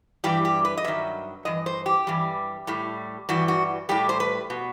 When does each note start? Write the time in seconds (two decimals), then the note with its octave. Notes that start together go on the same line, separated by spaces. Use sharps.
0.24 G2 E3 G3 G4
0.45 G4
0.65 B4
0.77 D#5
0.85 G2 D#3 F#3 E5
1.45 G2 E3 D#5
1.66 C5
1.86 G4
2.07 G2 E3 G3
2.67 A2 G3
3.29 G2 E3 G3 F#4
3.48 F#4
3.89 A2 G3 G4
4.09 C5
4.20 B4
4.50 B2